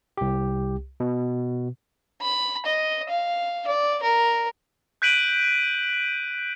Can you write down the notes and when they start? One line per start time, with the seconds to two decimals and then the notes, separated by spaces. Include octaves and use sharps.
0.17 C2 G4
1.00 B2
2.22 B5
2.66 D#5
3.09 F5
3.67 D5
4.03 A#4
5.02 F#6 G6 B6 D7 D#7 F#7